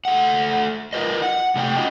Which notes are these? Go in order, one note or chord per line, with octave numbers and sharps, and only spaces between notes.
A3 F#5
F4 A#4 B4 D#5
F#5
C3 A3 D5 G5
C#4 F4 F#4 D#5